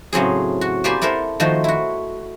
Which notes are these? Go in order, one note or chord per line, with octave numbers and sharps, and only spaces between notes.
A2 C#3 F#3 C4 G#4
F#4
A#3 G4 C5 D5 G#5 B5
E4 A4 A#4 C5 F#5
D#3 F3 A3 F#4 C5
E4 F#4